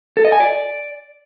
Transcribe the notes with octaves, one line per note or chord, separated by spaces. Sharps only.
A4
D#5
G#5
D5